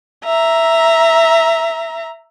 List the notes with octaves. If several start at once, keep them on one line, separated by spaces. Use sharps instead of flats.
E5 A#5